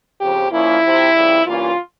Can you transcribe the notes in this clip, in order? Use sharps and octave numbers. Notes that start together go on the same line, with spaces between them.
F2 C#3 F3 G4
A#2 F3 A#3 C#4 E4
C3 F3 C4
F2 C#3 G3
G2 E3 A#3 C#4 F4